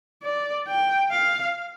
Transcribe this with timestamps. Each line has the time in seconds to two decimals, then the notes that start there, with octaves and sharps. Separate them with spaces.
0.23 D5
0.67 G5
1.11 F5